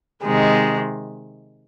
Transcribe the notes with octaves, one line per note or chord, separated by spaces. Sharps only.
C3 D#3 G#3